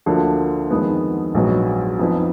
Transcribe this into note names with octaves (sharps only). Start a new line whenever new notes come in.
D2 D3 F3 A#3
F2 D#3 G#3 B3
A#1 G#2 F#3 B3
F2 F3 B3 D#4